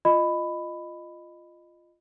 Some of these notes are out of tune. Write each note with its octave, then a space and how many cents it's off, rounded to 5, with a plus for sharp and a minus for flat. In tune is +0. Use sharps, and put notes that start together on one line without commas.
F4 -5 D#5 -15 B5 +10